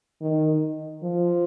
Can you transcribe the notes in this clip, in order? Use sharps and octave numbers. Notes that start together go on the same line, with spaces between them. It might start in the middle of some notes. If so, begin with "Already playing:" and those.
D#3
F3